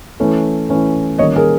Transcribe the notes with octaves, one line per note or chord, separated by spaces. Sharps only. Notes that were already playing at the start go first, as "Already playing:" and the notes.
E3 A3 C#4 E4
E3 A3 C#4 E4
D#3 G3 A#3 C#4 C#5 D#5
G#4 A#4